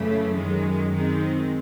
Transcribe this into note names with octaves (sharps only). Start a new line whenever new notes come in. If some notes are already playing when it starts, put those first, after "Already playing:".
Already playing: F#2 C#3 E3 A3
F#2 D#3 G#3
D#3 G#3 C4